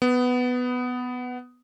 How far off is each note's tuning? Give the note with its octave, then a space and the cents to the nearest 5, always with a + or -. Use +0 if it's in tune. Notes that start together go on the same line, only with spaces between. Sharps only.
B3 +10